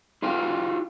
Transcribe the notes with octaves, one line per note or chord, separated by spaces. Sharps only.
E4 F4 G4 F5 G5